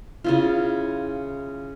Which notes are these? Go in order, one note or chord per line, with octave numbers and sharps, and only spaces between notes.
C#3 E4 F4